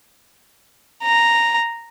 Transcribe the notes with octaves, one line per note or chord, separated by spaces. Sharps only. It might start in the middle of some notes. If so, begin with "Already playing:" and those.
A#5